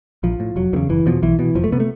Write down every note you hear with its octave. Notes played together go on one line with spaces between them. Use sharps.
A#1 F3
A2
F1 F#3
E2 C#3 D#3
F#1 E3
E2 B2 F3
B1 E3
B2 E3
F1 F3
A3
C3 B3
A3